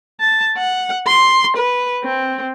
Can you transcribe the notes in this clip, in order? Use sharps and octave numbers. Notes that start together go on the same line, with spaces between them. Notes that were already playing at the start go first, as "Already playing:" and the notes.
A5
F#5
C6
B4
C4